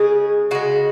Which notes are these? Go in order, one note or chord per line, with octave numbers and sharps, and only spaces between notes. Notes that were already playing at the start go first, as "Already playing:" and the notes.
Already playing: C#3 G#3 G#4
C#3 G#3 F#4